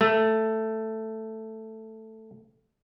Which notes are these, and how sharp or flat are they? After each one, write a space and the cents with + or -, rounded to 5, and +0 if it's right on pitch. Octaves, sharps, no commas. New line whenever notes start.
A3 +5